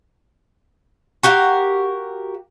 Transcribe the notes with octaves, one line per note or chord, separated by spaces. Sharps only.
F#4 G4 A#4 F5